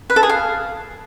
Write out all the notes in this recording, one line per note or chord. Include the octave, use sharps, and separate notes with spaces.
B4
A4
G#4
F5